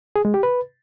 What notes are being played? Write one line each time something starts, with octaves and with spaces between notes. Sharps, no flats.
G#4
G#3
G4
B4